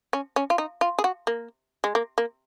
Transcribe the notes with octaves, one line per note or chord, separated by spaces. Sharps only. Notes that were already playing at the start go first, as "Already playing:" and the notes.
C#4
C#4
F4
D#4
F4
G#4
F#4
A#3
G#3
A#3
A#3